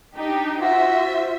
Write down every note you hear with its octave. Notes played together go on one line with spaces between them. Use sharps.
D4 D#4 G4
F4 F#4 C5 E5